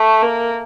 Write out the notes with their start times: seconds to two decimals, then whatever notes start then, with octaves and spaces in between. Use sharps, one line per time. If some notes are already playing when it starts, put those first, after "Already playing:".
Already playing: A3
0.21 A#3